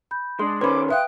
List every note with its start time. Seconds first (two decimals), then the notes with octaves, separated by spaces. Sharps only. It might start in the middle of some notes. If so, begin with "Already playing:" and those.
0.11 B5 G6
0.39 G#3 D4 C6
0.61 D#3 C#4 B4 C5 B5 C6 D6
0.89 B4 E5 F5 G5 D#6 F#6